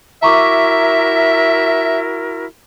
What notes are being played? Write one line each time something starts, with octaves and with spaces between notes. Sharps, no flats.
E4 F#4 A#4 E5 A#5 C#6 D6